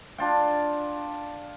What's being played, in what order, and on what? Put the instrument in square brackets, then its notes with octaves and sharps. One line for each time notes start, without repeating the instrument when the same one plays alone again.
[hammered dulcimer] D4 F4 G5